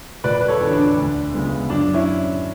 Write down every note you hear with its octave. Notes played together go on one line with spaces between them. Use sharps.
E1 B4 D5
B4
A4 C#5
E2 D3
D4
D2
C#3 G#3 B3
F#2 D4
C#4 E4